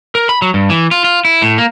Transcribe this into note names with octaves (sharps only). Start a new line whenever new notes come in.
A#4
B5
F#3
G2
E3
F4
F4
E4
A2
A#3